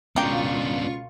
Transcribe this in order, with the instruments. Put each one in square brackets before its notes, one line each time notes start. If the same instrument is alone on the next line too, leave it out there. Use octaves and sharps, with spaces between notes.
[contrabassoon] C#2 [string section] B2 F4 C#6 [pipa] A#3 G5 [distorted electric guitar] B3 D4